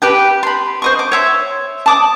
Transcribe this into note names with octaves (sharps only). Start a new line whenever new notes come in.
G4 B4 G5
B5 C6
C5 D#5 C#6
D6
C#5 E5 C6
A5 D6 D#6